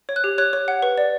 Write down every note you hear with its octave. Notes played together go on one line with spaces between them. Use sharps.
C#5
F#6
G4
C#5 F#6
C#5
F#5
B4
D5